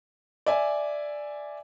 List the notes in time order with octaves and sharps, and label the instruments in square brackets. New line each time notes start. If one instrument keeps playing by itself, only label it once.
[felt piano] D5 E5 G#5